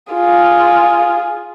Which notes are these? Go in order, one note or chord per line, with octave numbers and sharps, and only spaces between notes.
F4 G#4